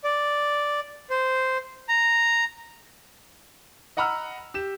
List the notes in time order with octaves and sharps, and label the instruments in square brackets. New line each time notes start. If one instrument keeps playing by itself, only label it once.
[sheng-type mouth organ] D5
C5
A#5
[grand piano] D#5 F#5 A#5 B5 E6 F6
G4 E7